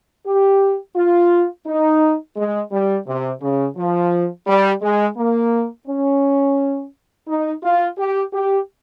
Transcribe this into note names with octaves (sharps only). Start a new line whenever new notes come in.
G4
F4
D#4
G#3
G3
C3
C#3
F3
G3
G#3
A#3
C#4
D#4
F4
G4
G4